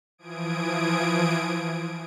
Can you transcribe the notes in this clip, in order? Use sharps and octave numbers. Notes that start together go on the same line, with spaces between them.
E3 F3 D#6 G#6 D7